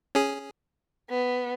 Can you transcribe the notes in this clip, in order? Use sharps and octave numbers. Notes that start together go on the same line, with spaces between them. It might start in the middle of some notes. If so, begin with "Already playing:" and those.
C#4 G#4
B3